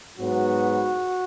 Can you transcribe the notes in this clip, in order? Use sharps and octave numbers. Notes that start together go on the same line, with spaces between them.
G#2 F#3 B3 F#4